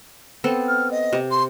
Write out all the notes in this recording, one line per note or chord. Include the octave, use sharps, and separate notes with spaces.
B3 C4 A4
F6
D#5
C3
C6